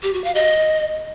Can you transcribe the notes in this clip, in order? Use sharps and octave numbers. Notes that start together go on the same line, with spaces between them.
G4
F#4
F5
D#5